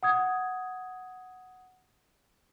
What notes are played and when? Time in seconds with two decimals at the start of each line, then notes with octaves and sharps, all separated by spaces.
0.03 F#5 D#6 G#6